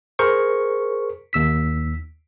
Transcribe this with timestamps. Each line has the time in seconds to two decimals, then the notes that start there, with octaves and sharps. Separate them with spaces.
0.19 G#4 A#4 C5 C#6
1.33 D#2 E6 B6